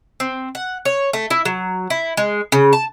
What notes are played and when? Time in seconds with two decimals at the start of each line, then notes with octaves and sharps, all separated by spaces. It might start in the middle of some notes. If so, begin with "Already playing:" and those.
0.20 C4
0.55 F#5
0.85 C#5
1.13 A3
1.30 E4
1.45 F#3
1.90 E4
2.17 G#3
2.52 C#3
2.73 A5